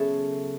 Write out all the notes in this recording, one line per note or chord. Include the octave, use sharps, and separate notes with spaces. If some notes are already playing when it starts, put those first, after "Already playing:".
Already playing: C#3 F#3 B3 A4 C#5 E5